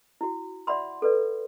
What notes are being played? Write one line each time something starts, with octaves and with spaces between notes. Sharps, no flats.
E4 F#4
D5 E5 F#5 B5 C6
A4 B4 D5